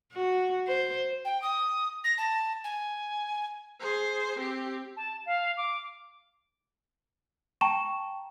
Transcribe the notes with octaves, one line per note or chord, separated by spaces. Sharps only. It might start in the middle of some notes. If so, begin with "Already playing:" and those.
F#4
C5
G5
D#6
A#6
A5
G#5
G#4 C5
C4 G4
A5
F5
D6
G5 A5 A#5 C#6 E7